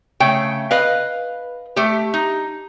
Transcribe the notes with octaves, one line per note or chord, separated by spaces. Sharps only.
C#3 A3 G5
B4 D#5 F5
A3 G4
D#4